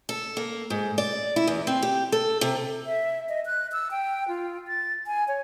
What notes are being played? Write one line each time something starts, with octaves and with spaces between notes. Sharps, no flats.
A4
A#3
G#2
D5
E4
E2
C4
G4
A4
C3
E5
D#5
F#6
E6
G5
F4
A6
G#5
C#5